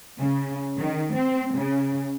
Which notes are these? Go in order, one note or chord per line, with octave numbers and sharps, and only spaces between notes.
C#3
D#3
C4
C#3